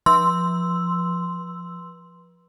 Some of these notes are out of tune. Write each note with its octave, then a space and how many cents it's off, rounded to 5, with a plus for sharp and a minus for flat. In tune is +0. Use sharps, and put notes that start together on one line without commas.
F3 +0 C6 -5 E6 +0